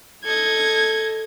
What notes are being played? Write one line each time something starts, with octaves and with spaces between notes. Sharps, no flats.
A4 D#5 G#6